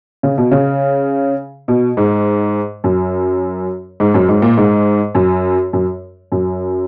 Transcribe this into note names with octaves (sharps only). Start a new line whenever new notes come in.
C#3
B2
C#3
B2
G#2
F#2
G#2
F#2
G#2
A#2
G#2
F#2
F#2
F#2